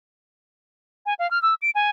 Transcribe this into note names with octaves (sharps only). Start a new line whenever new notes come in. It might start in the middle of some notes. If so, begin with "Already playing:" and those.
G#5
F5
F6
E6
D7
G#5